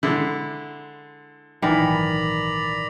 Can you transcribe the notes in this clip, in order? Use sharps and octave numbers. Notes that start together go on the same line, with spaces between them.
D3 G#3 E4
A#1 G#2 D#3 E3 F#3 D5 A#5 B5